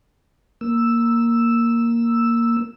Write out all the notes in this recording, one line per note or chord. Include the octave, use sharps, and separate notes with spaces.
A#3 E6